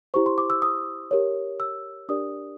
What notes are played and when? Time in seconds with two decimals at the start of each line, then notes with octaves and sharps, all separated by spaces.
0.14 E4 G4 C5 C#6
0.26 C6
0.38 D6
0.50 E6
0.62 D#6
1.11 G4 A#4 C#5
1.60 E6
2.09 D4 G4 A#4 D5 D#6